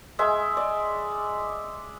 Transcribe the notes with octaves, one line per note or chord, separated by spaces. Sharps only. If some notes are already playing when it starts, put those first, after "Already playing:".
G#3 E5 C6
D5